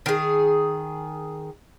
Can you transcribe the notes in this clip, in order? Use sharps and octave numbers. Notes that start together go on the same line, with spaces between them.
D#3 G#4